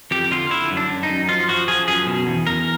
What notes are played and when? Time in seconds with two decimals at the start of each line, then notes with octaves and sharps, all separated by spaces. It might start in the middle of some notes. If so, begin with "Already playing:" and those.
0.11 F2 G4
0.31 D3 F4
0.50 D3 E4
0.71 F#2
0.77 D4
0.90 F#2
1.03 D#4
1.10 F#2
1.29 F3 F4
1.48 F3 F#4
1.68 F3 G#4
1.88 F#2 G#4
2.07 B2
2.27 E2
2.47 E2 A#4